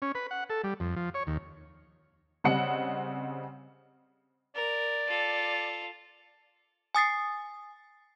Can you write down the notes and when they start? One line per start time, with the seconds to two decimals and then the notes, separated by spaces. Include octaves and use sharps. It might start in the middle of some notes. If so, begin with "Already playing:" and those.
0.02 C#4
0.15 B4
0.31 F#5
0.50 A4
0.64 G3
0.80 F2
0.96 F3
1.14 C#5
1.27 D#2
2.44 C#3 G3 C4 D#5 F#5 C#7
4.56 A#4 D5
5.07 F4 A4
6.95 G#5 D#6 A6 C7